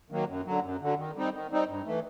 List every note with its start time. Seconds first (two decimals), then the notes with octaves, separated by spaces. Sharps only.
0.10 D#3 F#3 A#3
0.27 F#2
0.46 D3 F#3
0.63 F#2
0.81 D3 F#3
0.97 D#3
1.16 G3 C4 D#4
1.33 D#3
1.50 G3 C4 D#4
1.68 G2
1.86 E3 A3